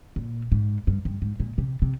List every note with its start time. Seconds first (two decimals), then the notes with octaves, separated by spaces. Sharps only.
0.16 A#2
0.52 G#2
0.87 G2
1.05 G2
1.22 G#2
1.40 A#2
1.58 C3
1.82 C3